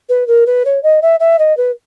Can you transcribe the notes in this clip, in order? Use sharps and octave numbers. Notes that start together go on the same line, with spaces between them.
B4
A#4
B4
C#5
D#5
E5
E5
D#5
B4